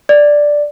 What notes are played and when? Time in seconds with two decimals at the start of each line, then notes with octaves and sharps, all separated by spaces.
0.09 D5